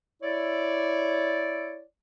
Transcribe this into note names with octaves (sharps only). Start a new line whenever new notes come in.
E4 C#5 D5